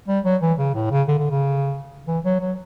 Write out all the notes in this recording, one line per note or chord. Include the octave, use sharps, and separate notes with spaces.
G3
F#3
E3
C#3
A2
C#3
D3
D3
C#3
E3
F#3
F#3